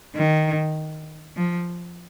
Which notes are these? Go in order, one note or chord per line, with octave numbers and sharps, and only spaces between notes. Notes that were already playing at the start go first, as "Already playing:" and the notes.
D#3
F3